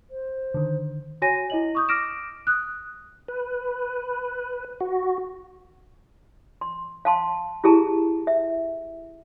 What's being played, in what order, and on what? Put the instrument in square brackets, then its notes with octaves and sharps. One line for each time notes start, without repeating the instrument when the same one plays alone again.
[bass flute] C5
[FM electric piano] D3 D#3
[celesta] F#4 C#5 G#5 A#6 D#7
E4 D#5 F#7
C#6 D#6 G6
D6 F6 A#6 D7 E7
D#6 F#6
[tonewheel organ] B4
F#4
[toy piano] C6
F5 A5 C6
E4 G4 G#4 A5 A#5
E5